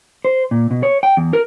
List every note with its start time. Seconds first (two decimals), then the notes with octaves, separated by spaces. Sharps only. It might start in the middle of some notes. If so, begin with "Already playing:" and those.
0.25 C5
0.51 A#2
0.71 B2
0.83 C#5
1.03 G5
1.17 E2
1.33 A#4